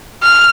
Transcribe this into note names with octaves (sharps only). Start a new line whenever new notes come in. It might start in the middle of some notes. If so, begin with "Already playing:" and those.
F6